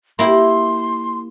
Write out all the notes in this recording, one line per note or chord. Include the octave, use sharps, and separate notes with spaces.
A#3 E4 G4 C6